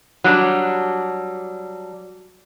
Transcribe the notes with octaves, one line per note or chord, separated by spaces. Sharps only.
F#3 G3 D4